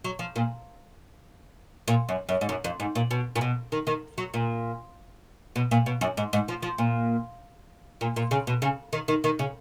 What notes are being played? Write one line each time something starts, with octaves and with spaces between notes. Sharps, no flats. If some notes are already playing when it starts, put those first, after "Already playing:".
F#3
F3
A#2
A#2
F#2
F#2
G#2
F#2
F2
G#2
A#2
B2
A#2
B2
D#3
D#3
F#3
A#2
B2
A#2
B2
F#2
G#2
G#2
F3
F3
A#2
A#2
A#2
C#3
B2
C#3
D#3
D#3
D#3
C#3